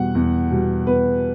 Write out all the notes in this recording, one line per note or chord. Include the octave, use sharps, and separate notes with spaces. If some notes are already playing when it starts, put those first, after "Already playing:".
Already playing: E2 B2 G3 F#5
E2
B2 G3
E2 B4